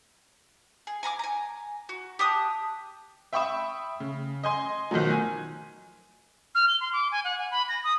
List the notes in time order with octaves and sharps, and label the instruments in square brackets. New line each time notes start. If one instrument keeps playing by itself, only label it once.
[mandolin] G#4
G#5 A#5 B5 D6
G#5 A#5
F#4
G4 A5 D#6 F#6
[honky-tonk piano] E5 G5 B5 C#6 D#6 E7
C#3
D#5 G#5 C6
B1 D#3 F3 F#3
G#5
[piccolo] F6
G7
C6
D6
G#5
F#5
G#5
B5
A#6
D#6